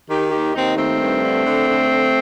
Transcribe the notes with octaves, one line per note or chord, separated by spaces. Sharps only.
D#3 D#4 G4
D#2 D#4 G4
D#2 C4 D#4
D#3 A3 C4
G2
D3
D3
D3
D3